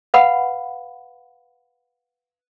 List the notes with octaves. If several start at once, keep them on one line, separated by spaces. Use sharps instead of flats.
B4 F5 F#5 B5